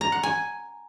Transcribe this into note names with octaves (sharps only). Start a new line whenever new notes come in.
A#5
F#5
G#5